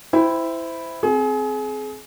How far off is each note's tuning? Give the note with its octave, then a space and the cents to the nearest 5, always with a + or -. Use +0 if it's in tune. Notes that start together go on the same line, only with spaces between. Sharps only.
E4 +0 C5 -25 G5 +0
C4 +0 G#4 +30